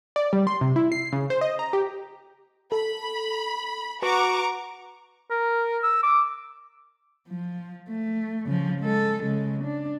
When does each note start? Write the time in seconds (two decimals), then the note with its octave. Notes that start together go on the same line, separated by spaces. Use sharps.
0.16 D5
0.33 G3
0.47 C6
0.61 C3
0.76 E4
0.92 C7
1.12 C#3
1.30 C5
1.41 D#5
1.59 A#5
1.73 G4
2.72 A4 B5
4.02 F#4 B4 A#5 C#6 D6
5.30 A#4
5.83 E6
6.03 D6
7.29 F3
7.89 A3
8.46 C#3 F3
8.81 G#3 A4
9.22 C#3 G#3
9.64 D4